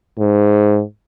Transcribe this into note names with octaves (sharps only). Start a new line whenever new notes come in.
G#2